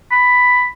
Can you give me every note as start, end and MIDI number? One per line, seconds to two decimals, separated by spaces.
0.12 0.67 83